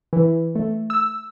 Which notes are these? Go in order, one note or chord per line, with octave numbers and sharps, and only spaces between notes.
E3
A3
E6